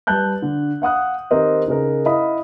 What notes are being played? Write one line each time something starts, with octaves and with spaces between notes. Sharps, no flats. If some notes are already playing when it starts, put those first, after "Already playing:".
G3 B4 A5 F#6 G6
D3
F5 F#5 D#6 F#6
D#3 C4 G4 A#4 C5 D#5
C#3 D#4 G#4 A#4
E4 D#5 F5 B5 D#6